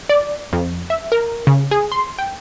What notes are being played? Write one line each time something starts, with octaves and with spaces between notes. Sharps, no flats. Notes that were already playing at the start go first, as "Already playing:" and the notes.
D5
F2
E5
A#4
C#3
G#4
C6
G5